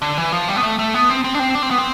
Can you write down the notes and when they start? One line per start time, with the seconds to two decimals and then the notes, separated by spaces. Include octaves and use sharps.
0.02 D3
0.18 E3
0.32 F3
0.48 G3
0.56 B3
0.63 A3
0.79 A3
0.94 B3
1.10 C4
1.24 C4
1.34 D4
1.39 C4
1.55 D4
1.63 C4
1.71 B3
1.78 C4